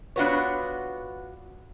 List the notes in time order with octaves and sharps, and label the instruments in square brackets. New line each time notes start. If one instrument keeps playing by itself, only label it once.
[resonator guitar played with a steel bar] B3 D4 F4 F#4 B4 C#5